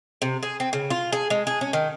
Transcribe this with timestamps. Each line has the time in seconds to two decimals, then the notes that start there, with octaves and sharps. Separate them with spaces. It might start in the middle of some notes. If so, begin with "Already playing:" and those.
0.22 C3
0.43 G#4
0.60 C4
0.73 C#3
0.90 F4
1.12 G#4
1.30 G#3
1.47 G#4
1.61 C#4
1.73 D#3